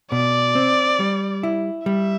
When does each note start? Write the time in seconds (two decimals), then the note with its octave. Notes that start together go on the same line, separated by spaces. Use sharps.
0.12 B2 D5
0.55 C4
1.00 G3
1.43 E4
1.86 G3 E5